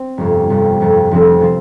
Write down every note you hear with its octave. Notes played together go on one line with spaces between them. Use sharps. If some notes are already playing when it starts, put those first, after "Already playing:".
Already playing: C4
G1 F2 C3
G1 F2 C3
G1 F2 C3
F1 F2 C3 F3 C4
C3 F3 C4